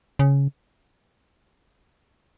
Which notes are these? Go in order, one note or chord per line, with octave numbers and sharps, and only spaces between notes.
C#3